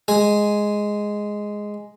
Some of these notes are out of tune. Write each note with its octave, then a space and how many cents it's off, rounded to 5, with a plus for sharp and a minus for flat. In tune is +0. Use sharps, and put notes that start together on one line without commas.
G#3 +0 G#5 +0